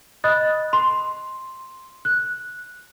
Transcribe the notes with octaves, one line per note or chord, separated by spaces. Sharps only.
D#5 B5 D#6 F#6 A6
C6
F#6